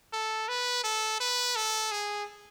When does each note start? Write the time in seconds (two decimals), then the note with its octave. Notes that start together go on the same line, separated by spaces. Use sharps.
0.13 A4
0.49 B4
0.84 A4
1.21 B4
1.56 A4
1.92 G#4